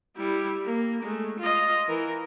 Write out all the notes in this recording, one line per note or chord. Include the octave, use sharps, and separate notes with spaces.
G3 E4
A#3
G#3 A3
F4 D#5
E3 A#4